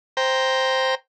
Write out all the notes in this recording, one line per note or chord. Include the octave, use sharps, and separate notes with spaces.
C5 G5 A#5